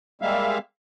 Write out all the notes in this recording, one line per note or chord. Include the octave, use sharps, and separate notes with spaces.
G3 G#3 A#3 E5 F5